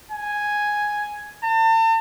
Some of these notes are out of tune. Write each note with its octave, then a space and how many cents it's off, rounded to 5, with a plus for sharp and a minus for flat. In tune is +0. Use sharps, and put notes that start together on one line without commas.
G#5 +0
A5 +40